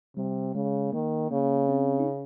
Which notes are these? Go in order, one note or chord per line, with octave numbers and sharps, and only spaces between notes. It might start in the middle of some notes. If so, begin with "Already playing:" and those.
C3 G3
C#3 G#3
D#3 A#3
C#3 A#3
C4
D#4
C#4